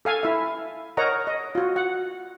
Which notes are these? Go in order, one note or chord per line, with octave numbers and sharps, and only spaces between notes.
A4 F5 G#5
E4 E5
A#4 C#5 D#5 F#5 A#5
D#5
F4 F#4
F#5